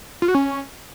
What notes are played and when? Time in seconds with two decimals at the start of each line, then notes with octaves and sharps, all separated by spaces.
0.22 F4
0.28 F#4
0.35 C#4